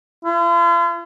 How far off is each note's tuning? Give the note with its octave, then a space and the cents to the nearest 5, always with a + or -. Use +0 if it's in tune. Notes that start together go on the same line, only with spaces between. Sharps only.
F4 -45